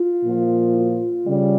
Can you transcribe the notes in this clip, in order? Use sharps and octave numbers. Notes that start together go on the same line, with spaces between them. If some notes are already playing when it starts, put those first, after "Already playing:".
Already playing: F4
A#2 F3
F4
C#3 G3